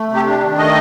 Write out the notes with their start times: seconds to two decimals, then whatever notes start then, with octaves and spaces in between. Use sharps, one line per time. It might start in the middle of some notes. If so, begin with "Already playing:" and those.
Already playing: A3
0.09 C3
0.14 G4
0.26 D4
0.36 G4
0.42 D#3
0.58 A3 D#5